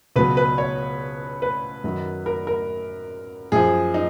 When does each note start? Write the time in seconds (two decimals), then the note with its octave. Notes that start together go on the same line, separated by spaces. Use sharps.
0.16 C#2 B2 F#3 B4
0.37 B4
0.58 C#5
1.42 B4
1.84 F#2 D#3 F#3
2.26 A#4
2.47 A#4
3.52 F#2 F3 G#4
3.94 D#4